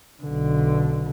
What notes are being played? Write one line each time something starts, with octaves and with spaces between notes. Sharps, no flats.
B1 D3